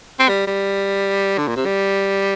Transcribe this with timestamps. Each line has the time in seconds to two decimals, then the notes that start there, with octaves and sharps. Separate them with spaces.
0.20 C4
0.29 G3
0.47 G3
1.38 D3
1.48 A#2
1.56 C3
1.65 G3